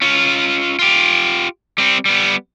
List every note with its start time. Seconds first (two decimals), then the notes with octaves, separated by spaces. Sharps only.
0.02 C#4 F4
0.79 F4 G4
1.78 G3 C4
2.05 G3 B3